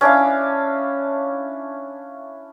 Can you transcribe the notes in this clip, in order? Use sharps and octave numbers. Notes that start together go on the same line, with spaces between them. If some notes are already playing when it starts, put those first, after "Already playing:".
C#4 D4 E4 F5